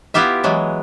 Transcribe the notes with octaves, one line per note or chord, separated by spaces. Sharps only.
B3 E4 F4 G4 E5
E3 F#3 G#3